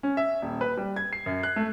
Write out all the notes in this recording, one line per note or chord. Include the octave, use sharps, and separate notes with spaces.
C#4
E5
D#1
B4
G3
G#6
C7
F#2
F#6
A3